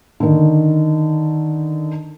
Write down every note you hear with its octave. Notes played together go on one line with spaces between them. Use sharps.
D3 D#3